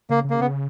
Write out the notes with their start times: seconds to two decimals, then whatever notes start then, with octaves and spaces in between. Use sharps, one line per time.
0.10 C#3 A#3
0.24 C#3
0.30 A#3
0.40 C#3 B3